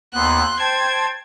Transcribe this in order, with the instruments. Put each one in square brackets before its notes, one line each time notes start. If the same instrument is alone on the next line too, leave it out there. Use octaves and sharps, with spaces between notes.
[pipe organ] D#2 B3 [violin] C6 F#6
[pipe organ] C5 G5 A5 [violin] G#6